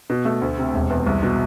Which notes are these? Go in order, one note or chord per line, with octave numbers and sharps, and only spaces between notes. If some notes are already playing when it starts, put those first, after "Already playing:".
B2
A3
D2
C3
E1
E2
C2
B2